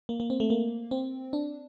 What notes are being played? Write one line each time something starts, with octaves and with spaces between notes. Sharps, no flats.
A#3
A#3
C4
A3
A#3
C4
D4